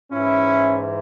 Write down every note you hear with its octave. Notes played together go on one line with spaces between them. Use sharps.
G#2 E3 C#4 E4